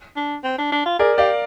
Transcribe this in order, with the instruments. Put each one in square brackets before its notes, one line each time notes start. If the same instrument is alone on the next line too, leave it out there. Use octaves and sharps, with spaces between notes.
[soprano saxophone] D4
C4
D4
D4
F4
[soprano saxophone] G#4 [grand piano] A#4 D5
[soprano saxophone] G4 [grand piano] D5 F5